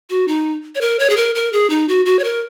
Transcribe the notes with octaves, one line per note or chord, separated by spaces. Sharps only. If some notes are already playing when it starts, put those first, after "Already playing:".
F#4
D#4
C#5
A#4
C#5
G#4
A#4
A#4
G#4
D#4
F#4
F#4
C#5
A#4